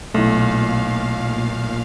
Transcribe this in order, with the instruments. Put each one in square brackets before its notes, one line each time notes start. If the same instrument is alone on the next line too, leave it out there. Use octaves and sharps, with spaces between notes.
[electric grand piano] B1 [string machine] A#2 F5 [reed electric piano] A3 E4